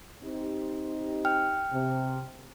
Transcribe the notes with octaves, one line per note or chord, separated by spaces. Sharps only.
C4 D#4 G4
G5 F6
C3